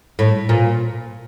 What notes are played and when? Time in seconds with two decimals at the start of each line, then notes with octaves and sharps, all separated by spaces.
0.19 A2
0.49 A#2